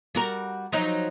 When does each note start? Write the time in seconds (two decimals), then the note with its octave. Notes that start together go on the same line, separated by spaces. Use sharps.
0.15 G3 F#4 A#4
0.72 F3 F#3 D#4